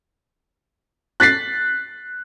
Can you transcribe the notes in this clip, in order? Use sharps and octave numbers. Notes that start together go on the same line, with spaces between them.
F#6 A6 B6 C7